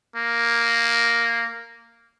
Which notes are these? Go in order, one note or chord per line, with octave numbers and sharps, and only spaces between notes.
A#3